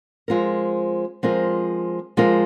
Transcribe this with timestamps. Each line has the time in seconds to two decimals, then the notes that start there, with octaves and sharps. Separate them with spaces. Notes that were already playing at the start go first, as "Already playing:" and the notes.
0.28 F3 G#3 C4 F4 A#4
1.23 F3 G#3 C4 F4 A#4
2.17 F3 G#3 C4 F4 A#4